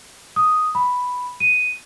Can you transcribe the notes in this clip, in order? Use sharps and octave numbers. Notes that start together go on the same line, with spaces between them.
D#6
B5
D#7